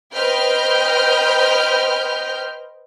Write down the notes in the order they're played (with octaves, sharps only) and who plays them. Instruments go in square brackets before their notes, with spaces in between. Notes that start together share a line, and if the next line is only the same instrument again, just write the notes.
[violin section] B4 C5 D#5 G5 F6 G6